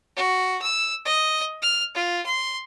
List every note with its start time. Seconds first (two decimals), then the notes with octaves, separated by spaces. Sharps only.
0.16 F#4
0.62 E6
1.05 D#5
1.62 F6
1.95 F4
2.26 C6